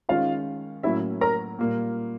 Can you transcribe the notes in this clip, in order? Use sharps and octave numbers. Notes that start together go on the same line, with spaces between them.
D#3 G#3 C#4 F4 F5
A2 F#3 A#3 C#4 E4 E5
A#4 A#5
A#2 G3 A#3